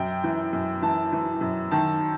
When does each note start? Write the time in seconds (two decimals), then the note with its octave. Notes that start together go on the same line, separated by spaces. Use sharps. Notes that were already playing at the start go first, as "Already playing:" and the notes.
Already playing: F#2 G5
0.24 E3
0.53 F#2
0.82 E3 A5
1.12 E3
1.41 F#2
1.71 D#3 A5